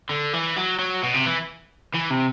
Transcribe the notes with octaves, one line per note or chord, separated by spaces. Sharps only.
D3
E3
F#3
F#3
B2
C3
E3
E3
C3